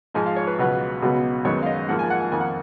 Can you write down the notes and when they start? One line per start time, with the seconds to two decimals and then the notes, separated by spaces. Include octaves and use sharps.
0.14 G#2 F3 G#3 G#5
0.26 F5
0.36 C#5
0.47 B4
0.58 C#2 B2 F#3 B3
1.02 C#2 B2 F#3 B3
1.45 F#2 D#3 G#3 B3 C#5
1.63 F5
1.66 D#5
1.88 G#2 F3 A#3 F#5
1.99 G#5
2.10 F#5
2.20 G#5
2.32 F2 D#3 A#3 G#5
2.40 F#5